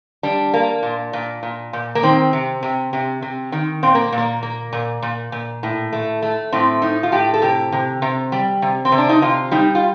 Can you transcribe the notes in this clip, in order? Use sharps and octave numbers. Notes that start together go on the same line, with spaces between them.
G3 D4
A#3
A#2
A#2
A#2
A#2
A#3
D#3 C4
C3
C3
C3
C3
D#3
A#2 C4
A#3
A#2
A#3
A#3
A#2
A#2
A#2
A2
A3
A3
A2 C4
A2 D#4
F4
A2 G4
A4
C3 G4
C3
C3
G3
C3
C4
C3
D4
D#4
C3 F4
G3 D#4
F4